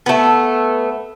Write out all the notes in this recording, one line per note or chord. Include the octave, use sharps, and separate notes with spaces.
A3 B3